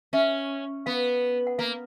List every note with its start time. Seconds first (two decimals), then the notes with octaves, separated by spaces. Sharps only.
0.13 C#4 E5
0.86 B3 F5
1.47 F#5
1.58 A#3 F5